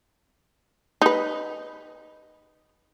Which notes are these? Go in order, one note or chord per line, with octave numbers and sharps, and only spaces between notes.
D#4 B4